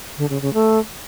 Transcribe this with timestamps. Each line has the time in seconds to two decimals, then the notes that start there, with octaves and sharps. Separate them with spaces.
0.18 D3
0.30 C#3
0.42 C#3
0.54 A3